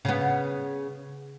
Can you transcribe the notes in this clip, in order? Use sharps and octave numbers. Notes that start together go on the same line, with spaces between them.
C#3 B3